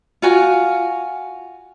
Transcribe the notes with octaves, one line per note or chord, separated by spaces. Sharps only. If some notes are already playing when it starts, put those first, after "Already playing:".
F4 F#4 G#5